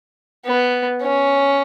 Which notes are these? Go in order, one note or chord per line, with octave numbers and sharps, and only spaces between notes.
B3
C#4